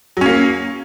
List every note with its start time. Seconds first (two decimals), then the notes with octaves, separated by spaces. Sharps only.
0.17 F#3
0.21 C#4
0.26 A#3